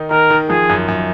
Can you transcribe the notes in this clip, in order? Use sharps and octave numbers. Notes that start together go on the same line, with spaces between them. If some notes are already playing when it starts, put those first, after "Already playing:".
Already playing: D#3 D#4
D#3 A#4
D#3
F3 G#4
F#2
F#2